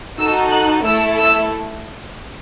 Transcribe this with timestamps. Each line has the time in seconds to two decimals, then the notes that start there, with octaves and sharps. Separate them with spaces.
0.17 D#4 F#4 A4 E6
0.51 F#6
0.84 A3 E4 A4 E6
1.18 E6